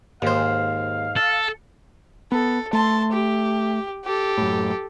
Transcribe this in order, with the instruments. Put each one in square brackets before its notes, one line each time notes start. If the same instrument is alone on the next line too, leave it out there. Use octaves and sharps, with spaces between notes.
[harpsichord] D#2 C5 [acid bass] G#2 [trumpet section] F5
[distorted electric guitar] A4
[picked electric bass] B3 [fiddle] A4
[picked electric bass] A3 [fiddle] A5 C6
[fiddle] G4
G4 A4
[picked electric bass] F#2 A2